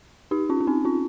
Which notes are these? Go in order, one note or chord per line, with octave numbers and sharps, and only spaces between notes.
D#4 G4
C#4 F4
C#4
C4 D#4
C#4 F4